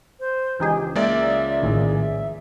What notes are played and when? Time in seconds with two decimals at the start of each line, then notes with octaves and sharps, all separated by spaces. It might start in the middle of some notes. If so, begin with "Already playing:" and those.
0.20 C5
0.60 C#2 E3 D#4 G4 G#4
0.96 G#3 A#3 D5 E5
1.62 A#1 A2 D#3 G#4
2.01 E5